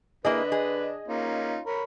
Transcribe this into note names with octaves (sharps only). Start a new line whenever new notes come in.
D3 A#3 D4 E4 G#4 B4 D#5
G#4
A#3 C#4 D#4 F4
A#4 C#5 B5